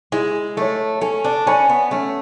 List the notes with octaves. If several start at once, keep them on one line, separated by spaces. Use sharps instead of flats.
G#3 E4
A3 A4 C#5
C#4 A4
D4
C#4 D5 G#5 B5
B3
A3 C#4